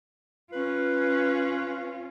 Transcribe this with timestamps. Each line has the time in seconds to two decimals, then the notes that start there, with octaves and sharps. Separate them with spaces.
0.52 C#4 F4 B4